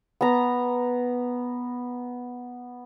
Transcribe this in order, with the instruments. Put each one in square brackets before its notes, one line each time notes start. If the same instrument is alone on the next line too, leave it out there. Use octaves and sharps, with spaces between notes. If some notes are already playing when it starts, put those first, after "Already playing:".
[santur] B3 A#5